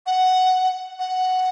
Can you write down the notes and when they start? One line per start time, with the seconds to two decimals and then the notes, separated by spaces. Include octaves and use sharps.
0.06 F#5
0.99 F#5